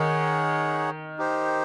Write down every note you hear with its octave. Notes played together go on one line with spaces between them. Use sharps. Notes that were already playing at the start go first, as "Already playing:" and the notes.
Already playing: D#3 D#4 G#4 C#5 F#5
D#4 G4 C5